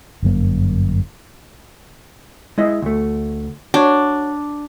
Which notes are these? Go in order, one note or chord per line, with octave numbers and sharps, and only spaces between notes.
G1 F#2 A#3
G#3 E4 D#5
D2 A3
D4 F#4 C#5